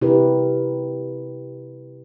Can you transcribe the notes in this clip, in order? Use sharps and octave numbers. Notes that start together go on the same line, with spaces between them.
C3 E4 G4 A#4 B4